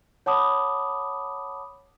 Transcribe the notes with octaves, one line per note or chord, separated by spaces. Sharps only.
C#5 F#5 A5 B5 D6 D#6